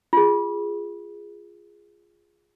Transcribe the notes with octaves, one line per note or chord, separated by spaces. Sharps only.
F4 G#4